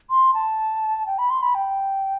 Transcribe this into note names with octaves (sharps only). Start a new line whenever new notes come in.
C6
A5
G5
B5
C6
B5
G5